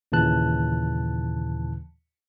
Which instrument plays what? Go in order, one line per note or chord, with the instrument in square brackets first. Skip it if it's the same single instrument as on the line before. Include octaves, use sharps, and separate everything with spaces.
[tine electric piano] D#2 A#2 C#3 E3 A5 F#6